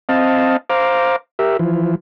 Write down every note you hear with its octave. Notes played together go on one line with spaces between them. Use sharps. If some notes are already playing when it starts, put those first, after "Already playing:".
C4 D#5 F5 A5
C5 F5 A#5 D6
G4 A#4 E5
E3 F3